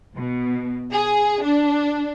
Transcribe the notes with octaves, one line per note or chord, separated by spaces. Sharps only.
B2
G#4
D4